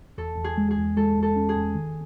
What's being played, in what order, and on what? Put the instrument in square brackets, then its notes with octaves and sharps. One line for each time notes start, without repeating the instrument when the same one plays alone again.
[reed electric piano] E2 [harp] A4
[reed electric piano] E2
[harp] G#4
[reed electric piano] G#3
[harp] G#4
[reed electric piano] E2
[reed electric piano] G#3 [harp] A4
[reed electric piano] E2
[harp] A4
[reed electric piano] C#4
[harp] G#4
[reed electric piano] E2
D#3